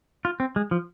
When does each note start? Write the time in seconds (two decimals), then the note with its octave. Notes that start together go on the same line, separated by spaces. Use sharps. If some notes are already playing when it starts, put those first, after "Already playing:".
0.25 F4
0.40 C4
0.56 G#3
0.71 F3